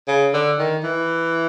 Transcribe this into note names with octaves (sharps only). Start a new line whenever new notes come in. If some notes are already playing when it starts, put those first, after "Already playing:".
C#3
D3
D#3
E3